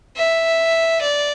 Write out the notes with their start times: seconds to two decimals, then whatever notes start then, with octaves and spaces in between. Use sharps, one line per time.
0.17 E5
1.02 D5